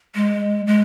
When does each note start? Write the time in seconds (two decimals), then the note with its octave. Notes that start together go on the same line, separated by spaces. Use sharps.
0.15 G#3
0.67 G#3